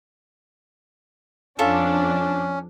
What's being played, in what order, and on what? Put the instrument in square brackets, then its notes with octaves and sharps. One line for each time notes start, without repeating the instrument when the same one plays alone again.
[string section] F2 D4 [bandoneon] C#4 [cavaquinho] F4 A4 E5